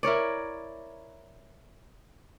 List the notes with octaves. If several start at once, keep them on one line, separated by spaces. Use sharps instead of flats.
E4 A#4 C#5 D5